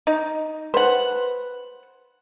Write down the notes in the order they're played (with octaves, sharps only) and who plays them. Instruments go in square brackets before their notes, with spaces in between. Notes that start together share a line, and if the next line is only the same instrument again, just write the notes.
[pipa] D#4
[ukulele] B4 [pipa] C5 F#5